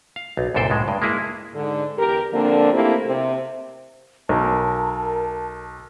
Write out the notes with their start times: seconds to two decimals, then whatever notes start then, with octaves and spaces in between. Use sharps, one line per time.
0.16 F5
0.37 B1
0.55 C2 F#2 A#2 A4 C5 G5
0.70 C#2 A2 G#3
0.88 G2
1.02 G#3 A#3 E4 G#4
1.54 G#2 D3
1.98 E2 G4 A#4
2.33 D3 F3 A#3 C4 D4
2.73 A3 A#3 C4 E4 G4
3.06 C3
4.29 B1 A#4 A5